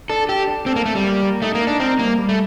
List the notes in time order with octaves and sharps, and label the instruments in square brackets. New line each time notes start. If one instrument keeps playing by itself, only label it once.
[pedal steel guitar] D4 [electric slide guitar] A4
[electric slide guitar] G4 [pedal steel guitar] A4
[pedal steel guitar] D4
[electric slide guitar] C4 [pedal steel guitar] A4
[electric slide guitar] A#3
[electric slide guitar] A3 [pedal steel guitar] C4
[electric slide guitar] G3
[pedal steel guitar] A#3
A#3
[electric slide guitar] A3 [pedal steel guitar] D#4
[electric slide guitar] A#3
[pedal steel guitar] D#4
[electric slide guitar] D4
[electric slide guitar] C4 [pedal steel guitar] A#4
[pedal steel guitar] G3 [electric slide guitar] A#3
[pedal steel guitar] G3
[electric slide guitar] A3